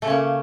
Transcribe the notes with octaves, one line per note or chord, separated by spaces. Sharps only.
C#3 A3 A#3 C#4